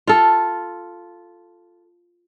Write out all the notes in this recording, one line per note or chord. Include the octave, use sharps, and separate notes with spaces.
F4 A4